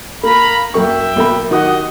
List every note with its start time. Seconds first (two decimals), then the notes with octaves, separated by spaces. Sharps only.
0.23 A#3 F5 A#5 B5
0.74 F#2 A#3 E5 G5 C#6
1.16 B1 A#3 B5
1.51 D#3 F#4 G4 D#5 F#5 D#6